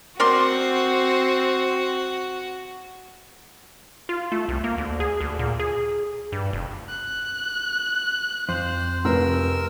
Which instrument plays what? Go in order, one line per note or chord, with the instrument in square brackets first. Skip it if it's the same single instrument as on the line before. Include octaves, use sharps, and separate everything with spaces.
[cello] C4 [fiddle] F#4 [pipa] A#4 D5 C6
[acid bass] F4
A3
C2
A#3
D2
G#4
D2
A#2
G#4
G2
F1
[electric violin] F#6
[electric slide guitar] F2 [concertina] C5
[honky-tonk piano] F1 [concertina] A#4 E6